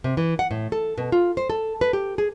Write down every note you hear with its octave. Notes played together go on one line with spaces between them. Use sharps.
C3
E3
F#5
A2
A4
B2
F4
C5
A4
B4
G4
G#4